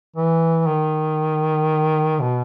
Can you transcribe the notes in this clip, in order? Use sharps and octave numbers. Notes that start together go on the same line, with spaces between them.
E3
D#3
B2